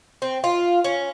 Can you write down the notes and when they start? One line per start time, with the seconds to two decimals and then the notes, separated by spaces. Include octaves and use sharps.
0.22 C4
0.44 F4
0.84 C#4